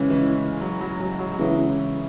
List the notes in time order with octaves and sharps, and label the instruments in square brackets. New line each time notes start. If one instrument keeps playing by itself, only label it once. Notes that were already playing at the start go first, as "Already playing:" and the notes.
Already playing: [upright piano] C#3 G#3 C#4 [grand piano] E3
[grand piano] E3
F#3
F#3
F#3
F#3
F#3
[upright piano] C#3 E3 C#4 E4 [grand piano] G#3